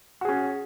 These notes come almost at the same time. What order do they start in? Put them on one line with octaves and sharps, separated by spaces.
F#4 G#4 C#4